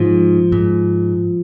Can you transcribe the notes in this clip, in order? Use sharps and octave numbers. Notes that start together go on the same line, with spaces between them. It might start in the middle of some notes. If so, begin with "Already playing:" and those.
Already playing: G#2 F3
G#2